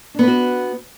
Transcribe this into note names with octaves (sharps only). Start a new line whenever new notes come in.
B3 D4 F#4 B4